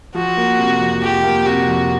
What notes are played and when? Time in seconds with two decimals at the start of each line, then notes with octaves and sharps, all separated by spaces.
0.15 F3 F#4
0.37 A#3
0.59 C3
0.81 F2
1.02 F3 G4
1.24 A#3
1.46 C3 F#4
1.68 F2